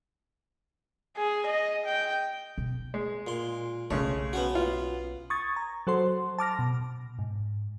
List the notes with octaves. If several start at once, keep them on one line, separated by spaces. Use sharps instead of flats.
G#4
D#5
G5
B2
G#3
A#2 C6
B1 C#3 G#3 A3 C#5
B3 C#4 F#4
F4
C#6 D#6 G#6 A6
A#5
F#3 F#4 A4 C5 C6
A5 D6 F6 A#6
B2
G#2